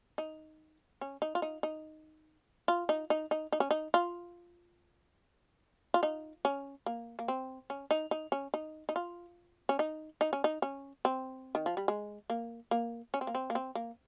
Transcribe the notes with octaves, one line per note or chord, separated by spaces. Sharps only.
D#4
C#4
D#4
F4
D#4
D#4
F4
D#4
D#4
D#4
D#4
C#4
D#4
F4
F4
D#4
C#4
A#3
A#3
C4
C#4
D#4
D#4
C#4
D#4
D#4
F4
C#4
D#4
D#4
C#4
D#4
C#4
C4
D#3
F3
G3
G#3
A#3
A#3
C#4
C4
A#3
C4
A#3
C4
A#3